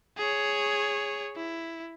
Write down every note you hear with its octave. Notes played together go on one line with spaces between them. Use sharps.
G#4 C#5
E4